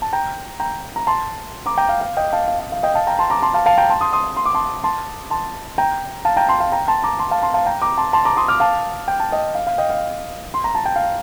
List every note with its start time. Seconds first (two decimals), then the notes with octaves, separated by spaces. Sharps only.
0.02 A5
0.13 G5 A#5
0.60 G5 A#5
0.96 A#5
1.07 A5 C6
1.66 A#5 D6
1.78 G5 A#5
1.89 F5
2.01 F5
2.17 D#5 G5
2.33 F5 A5
2.48 F5
2.60 F5
2.72 F5
2.83 D#5 G5
2.95 F5 A5
3.07 G5 A#5
3.19 A5 C6
3.30 A#5 D6
3.42 A5 C6
3.54 F5 A5
3.66 F5 A5
3.78 G5 A#5
3.90 A5 C6
4.01 C6 D#6
4.13 C6 D#6
4.37 C6
4.46 D6
4.55 A5 C6
4.84 A5 C6
5.30 A5 C6
5.78 G5 A#5
6.25 F5 A5
6.37 G5 A#5
6.48 A5 C6
6.60 F5 A5
6.72 G5 A#5
6.88 A5 C6
7.04 A#5 D6
7.19 A5 C6
7.31 F5 A5
7.42 A5 C6
7.54 F5 A5
7.66 G5 A#5
7.82 A#5 D6
7.98 A5 C6
8.13 A5 C6
8.25 A#5 D6
8.37 C6 D#6
8.48 D6 F6
8.60 F5 A5
9.08 G5
9.20 A5
9.32 D#5 G5
9.55 F5
9.67 F5
9.78 D#5 G5
9.90 F5
10.54 C6
10.64 A#5
10.75 A5
10.86 G5
10.96 F5